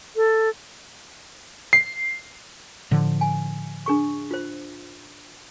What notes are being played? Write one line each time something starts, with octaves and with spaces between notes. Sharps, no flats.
A4
C7
A2 D3 F3
G#5
D4 G#4 C#6
F4 C5